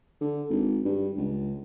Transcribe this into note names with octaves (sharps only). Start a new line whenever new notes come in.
D3
G#1
G2
C#2